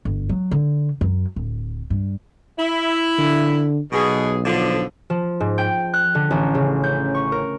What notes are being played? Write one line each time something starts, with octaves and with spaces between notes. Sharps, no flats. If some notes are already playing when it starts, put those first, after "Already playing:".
G1
F#3
D3
F#2
D1
G2
E4
D3
B1 B2 G#4
D3 F3
F3
G#2
G5
F#6
D3
A1
C#3
G6
C#6
A#4